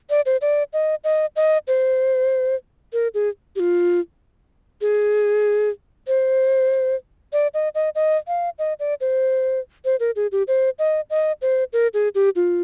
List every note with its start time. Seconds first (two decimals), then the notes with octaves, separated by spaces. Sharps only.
0.10 D5
0.26 C5
0.41 D5
0.73 D#5
1.04 D#5
1.36 D#5
1.67 C5
2.93 A#4
3.14 G#4
3.56 G4
3.60 F4
4.81 G#4
6.07 C5
7.33 D5
7.54 D#5
7.75 D#5
7.95 D#5
8.28 F5
8.59 D#5
8.80 D5
9.01 C5
9.85 C5
10.00 A#4
10.16 G#4
10.32 G4
10.48 C5
10.79 D#5
11.10 D#5
11.42 C5
11.73 A#4
11.94 G#4
12.15 G4
12.36 F4